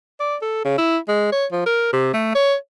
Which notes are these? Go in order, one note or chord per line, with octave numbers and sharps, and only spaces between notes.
D5
A4
C#3
E4
G#3
C#5
F3
A#4
C3
A3
C#5